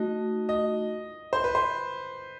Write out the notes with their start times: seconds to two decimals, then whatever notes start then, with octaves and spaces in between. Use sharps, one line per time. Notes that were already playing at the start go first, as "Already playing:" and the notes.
Already playing: A3 D#4 F#4 D#5
0.49 D#5
1.33 C5
1.44 B4
1.55 C5